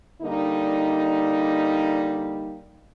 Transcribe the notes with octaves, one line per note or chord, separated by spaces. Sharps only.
D3 G3 A#3 D#4